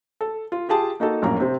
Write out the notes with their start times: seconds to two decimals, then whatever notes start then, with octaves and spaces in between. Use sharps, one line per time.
0.21 A4
0.52 F4
0.69 F4 G4 G#4 A5
1.00 A#3 D#4 F#4 A4
1.22 A#1 F#2 A2 A#3 A#5
1.40 C3 C4